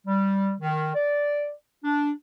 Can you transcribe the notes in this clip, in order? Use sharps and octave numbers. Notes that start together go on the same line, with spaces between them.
G3
D#3
D5
D4